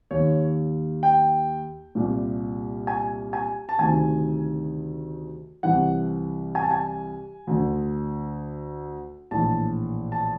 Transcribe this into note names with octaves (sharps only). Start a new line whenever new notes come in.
D#2 D#3 C#5
G5
C2 A#2
G#5
G#5
A5
D2 C3 D#3 G#5
C2 C3 E3 F#5
G#5
A5
G#5
D2 D3
A#1 A2 E3 A5
A5